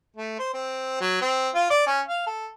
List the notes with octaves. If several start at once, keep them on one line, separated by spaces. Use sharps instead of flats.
A3
C5
C4
F#3
C4
F4
D5
C#4
F5
A4